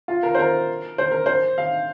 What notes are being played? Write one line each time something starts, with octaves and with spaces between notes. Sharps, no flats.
F4
A#4
C5
A#4
C5
A#4
C5
F5